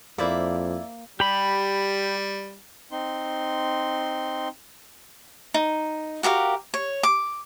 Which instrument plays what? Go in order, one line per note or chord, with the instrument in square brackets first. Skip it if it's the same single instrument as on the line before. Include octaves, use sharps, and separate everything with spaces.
[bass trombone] F2 [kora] A#3 C5 [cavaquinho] E4 D5 E5
[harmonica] G3 [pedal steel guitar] G4 B5
[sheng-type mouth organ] C4 D#4 C6
[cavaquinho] D#4
F#4 G4 A#4 F5
C#5
D6